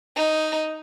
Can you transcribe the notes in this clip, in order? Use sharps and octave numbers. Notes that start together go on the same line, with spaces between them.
D#4